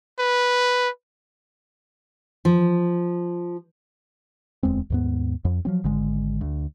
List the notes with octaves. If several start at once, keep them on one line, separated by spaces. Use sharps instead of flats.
B4
F3
D1 E2 G#3 C4
D#2 G#2 B3
F2
F3 F#3 C4
G#1 D3 G#3
D2